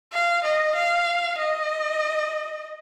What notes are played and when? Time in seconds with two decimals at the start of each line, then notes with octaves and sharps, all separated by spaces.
0.13 F5
0.44 D#5
0.75 F5
1.37 D#5